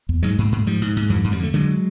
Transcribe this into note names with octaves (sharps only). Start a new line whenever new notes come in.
E2
G#2 F#3 G#3
G#2
G#2
G#2 F3 G3
G#2
G#2
F2 E3 F#3
F2
F3 G3
D3 A3
D3 F#3 G#3